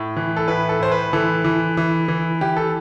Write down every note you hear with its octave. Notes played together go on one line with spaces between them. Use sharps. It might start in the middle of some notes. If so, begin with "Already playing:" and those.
Already playing: A2
E3
A4
A2 B4
A4
A2 C5
B4
E3 A4
E3
E3
E3
E3 G4
A4